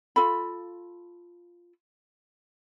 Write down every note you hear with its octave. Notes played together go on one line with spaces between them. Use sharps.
F4 A4 B5